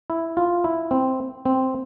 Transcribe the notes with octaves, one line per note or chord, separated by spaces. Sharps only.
E4
F4
E4
C4
C4